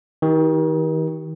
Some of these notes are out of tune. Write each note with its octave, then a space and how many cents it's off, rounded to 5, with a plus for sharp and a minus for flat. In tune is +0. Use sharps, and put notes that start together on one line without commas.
D#3 +35 G4 -15